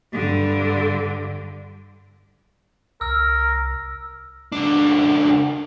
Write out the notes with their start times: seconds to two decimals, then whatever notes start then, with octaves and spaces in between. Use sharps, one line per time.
0.13 G2 D3
3.01 C2 A#4 E6
4.52 C#2 D4